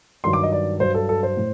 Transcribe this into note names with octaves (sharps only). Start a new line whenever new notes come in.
G2 D#3 F#3 C6
D6
D#5
D5
G2 F#3 C5
A4
A4
C5
A2